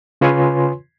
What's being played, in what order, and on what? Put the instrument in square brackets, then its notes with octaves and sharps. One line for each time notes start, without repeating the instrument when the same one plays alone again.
[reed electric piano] C#3 F4 B4 C#5 G#5 C6